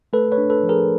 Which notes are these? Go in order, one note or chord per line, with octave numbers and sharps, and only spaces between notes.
A3 A4 B4
B4 C#5
D4
A4 B4
F3
G#4 A#4